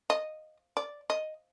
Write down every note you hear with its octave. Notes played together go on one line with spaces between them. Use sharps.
D#5
D5
D#5